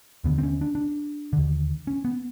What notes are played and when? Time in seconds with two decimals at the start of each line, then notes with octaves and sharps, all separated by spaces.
0.24 D#2 D3 B3
0.38 C4
0.43 C#4
0.61 D4
0.75 D4
1.33 D#2 D3
1.87 C#4
2.05 B3